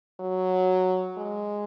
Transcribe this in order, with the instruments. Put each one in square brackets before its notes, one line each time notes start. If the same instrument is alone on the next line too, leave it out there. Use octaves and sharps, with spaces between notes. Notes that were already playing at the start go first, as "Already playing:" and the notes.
[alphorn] F#3
G#3